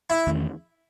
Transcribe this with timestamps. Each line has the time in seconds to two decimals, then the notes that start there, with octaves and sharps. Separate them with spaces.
0.10 E4
0.27 E2 D#3 A3 C#4